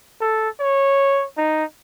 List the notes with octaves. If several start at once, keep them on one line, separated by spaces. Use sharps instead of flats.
A4
C#5
D#4